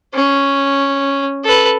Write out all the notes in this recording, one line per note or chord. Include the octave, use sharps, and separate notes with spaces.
C#4
A4 B4